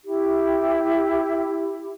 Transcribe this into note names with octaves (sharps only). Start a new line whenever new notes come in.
E4 G4